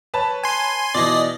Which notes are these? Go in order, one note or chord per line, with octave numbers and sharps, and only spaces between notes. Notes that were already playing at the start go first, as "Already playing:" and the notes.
B4 C#5 A5
G#5 C6
B2 E3 D5 D#5